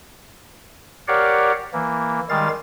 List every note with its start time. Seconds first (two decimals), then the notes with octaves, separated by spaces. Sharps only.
1.08 G4 A#4 C#5 D5 F5 F#5
1.73 E3 A#3
2.29 D#3 G3 G#3 F5 A6